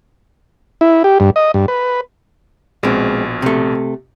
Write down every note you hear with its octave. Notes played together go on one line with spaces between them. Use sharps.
E4
G4
G2
D#5
G2
B4
A#1 B2 G#3 C4
C3 A3